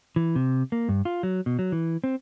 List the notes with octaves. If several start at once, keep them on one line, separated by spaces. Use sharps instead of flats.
E3
C3
A#3
G2
F4
F#3
B2
F#3
E3
C4